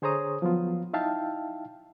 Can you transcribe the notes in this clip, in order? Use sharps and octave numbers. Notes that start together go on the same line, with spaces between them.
D3 G#4 C5 C#5 A#5 D#6
F3 F#3 B3 F4
D#4 E4 E5 F5 G5 A5